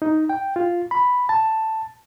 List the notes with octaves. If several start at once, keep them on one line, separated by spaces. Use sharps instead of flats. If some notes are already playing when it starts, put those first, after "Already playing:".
D#4
G5
F4
B5
A5